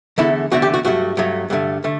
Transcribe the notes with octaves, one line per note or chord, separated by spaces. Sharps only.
E2 D3 A3 E4
E2 D3 A3 F#4
G4
F#4
G2 F#3 A3 F#4
G2 F#3 A3
G2 D3 A3
D3 A3